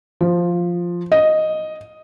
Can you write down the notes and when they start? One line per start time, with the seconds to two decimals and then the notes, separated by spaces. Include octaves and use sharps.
0.21 F3
1.12 D#5